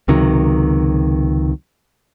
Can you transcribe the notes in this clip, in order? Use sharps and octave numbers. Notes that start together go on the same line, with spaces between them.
C#2 C3 D#3 F#3